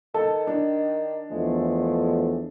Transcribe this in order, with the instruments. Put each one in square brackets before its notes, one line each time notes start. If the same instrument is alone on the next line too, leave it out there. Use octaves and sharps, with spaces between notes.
[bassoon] D#3 [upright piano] A4 A5
[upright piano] D4
[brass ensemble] E2 F3 A3 [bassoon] G#3